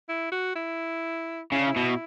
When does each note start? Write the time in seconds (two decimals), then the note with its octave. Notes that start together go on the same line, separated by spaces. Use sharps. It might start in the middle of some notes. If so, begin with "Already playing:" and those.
0.09 E4
0.32 F#4
0.56 E4
1.52 C#3 E4
1.59 D4
1.66 E4
1.76 B2